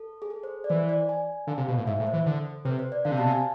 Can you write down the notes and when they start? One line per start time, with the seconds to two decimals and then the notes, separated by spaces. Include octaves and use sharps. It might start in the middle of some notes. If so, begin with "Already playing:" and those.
Already playing: A4
0.22 G#4
0.30 A4
0.43 C5
0.64 D5
0.70 E3 C5
0.89 D5
1.09 G#5
1.47 D3 F5
1.58 C3
1.68 B2
1.77 A2
1.87 G#2 E5
2.00 A2
2.07 C5
2.13 E3
2.26 D3 A4
2.65 C3 B4
2.79 C5
2.92 D5
3.05 D3 F5
3.12 C3
3.17 B2 A5
3.26 C3
3.31 G#5